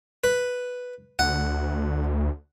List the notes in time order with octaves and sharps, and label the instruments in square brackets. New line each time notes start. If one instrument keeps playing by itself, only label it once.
[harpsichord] B4
[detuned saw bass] D2 [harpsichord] F#5